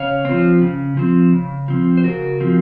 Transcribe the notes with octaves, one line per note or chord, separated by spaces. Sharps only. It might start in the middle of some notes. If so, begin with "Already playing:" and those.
Already playing: C#3 C#5 F5
F3 C4
C#3
F3 C4
C#3
F3 C4
C5
C#3 F#4 A#4
F3 C4